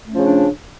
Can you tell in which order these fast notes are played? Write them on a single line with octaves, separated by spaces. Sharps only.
A3 C#4 F3 C#3 D4